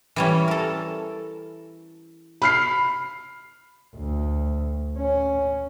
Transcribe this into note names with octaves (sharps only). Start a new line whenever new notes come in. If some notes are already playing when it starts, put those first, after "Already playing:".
E3 G3 C#4
A4 A#4
B5 F6 C7
D2
C#4